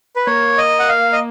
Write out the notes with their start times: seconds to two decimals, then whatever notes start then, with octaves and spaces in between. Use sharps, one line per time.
0.16 B4
0.27 A#3 C#5
0.58 D#5
0.79 F#5
0.89 F5
1.13 D#5